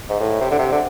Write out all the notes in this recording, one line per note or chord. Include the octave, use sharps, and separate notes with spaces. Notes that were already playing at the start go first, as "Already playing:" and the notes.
G#2
A2
C3
D3
C3
D3